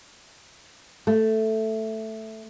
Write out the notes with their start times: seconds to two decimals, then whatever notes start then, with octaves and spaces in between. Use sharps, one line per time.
1.07 A3